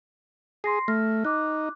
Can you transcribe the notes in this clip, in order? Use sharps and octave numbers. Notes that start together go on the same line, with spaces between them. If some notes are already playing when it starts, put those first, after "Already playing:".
G#4 C6 A#6 C7
A3 F6 A#6
D#4 D6 F#6